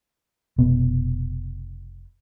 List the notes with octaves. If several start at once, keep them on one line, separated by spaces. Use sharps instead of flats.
F1 B2 B3